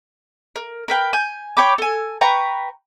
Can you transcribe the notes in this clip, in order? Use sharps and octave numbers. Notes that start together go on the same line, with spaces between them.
A#4
A#4 B4 G5
G#5 G6
C#5 G5 B5 D6
A4 G#5
B4 G5 A#5 C#6